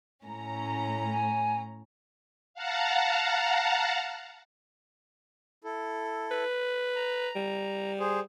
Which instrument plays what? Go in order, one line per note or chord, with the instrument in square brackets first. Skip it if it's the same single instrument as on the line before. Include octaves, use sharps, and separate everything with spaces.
[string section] A2 C#4 A#5
[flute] G#5
[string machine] F5 F#5 A5 A#5
[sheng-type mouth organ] E4 A4
[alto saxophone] B4
[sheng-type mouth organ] A#5
[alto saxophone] G3
[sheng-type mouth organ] G#4 C5